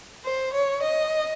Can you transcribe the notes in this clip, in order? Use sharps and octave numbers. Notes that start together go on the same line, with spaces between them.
C5
C#5
D#5